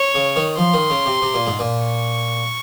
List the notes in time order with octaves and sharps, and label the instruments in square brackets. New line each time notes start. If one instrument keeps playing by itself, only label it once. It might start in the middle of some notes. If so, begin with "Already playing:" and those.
Already playing: [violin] C#5
[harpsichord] C#3
D#3
[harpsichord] F3 [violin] C6
[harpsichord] D#3
C#3
C3
C3
A#2
G#2
A#2
[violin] C#6